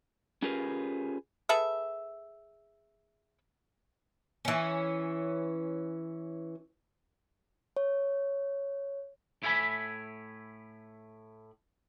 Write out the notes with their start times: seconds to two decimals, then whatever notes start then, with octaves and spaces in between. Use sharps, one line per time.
0.42 C#4 F4 G4 G#4 A#4 B4
1.49 G#4 A4 B4 E5
4.45 E3 C#4
7.77 C#5
9.43 A2 E4 E5 G#5 B5